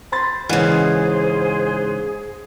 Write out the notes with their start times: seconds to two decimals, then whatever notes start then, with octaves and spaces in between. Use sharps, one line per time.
0.12 C5 B5 C6 A6
0.49 G#2 C#3 E3 G#4